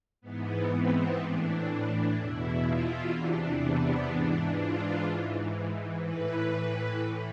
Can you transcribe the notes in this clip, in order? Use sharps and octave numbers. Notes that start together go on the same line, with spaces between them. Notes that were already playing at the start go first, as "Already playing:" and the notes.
G#2 E3 B3
C4
A2 E3 D4
D4
E2 B2 E4
F4
E2 C3 E3 D4
B3
G#2 E3 D4
F4
G#2 E3
A2 E3 B4
A2 E3